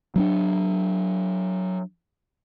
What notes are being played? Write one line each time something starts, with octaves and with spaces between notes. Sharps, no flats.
F#3 C#4 D4